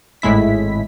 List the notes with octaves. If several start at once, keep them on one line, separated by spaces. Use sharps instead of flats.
G#1 A2 G#3 E4 B6